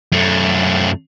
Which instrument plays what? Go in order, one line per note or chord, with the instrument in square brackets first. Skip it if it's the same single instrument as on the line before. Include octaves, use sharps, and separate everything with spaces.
[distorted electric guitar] F#2 A3